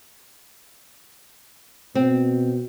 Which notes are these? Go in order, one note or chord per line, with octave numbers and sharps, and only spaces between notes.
B2 C4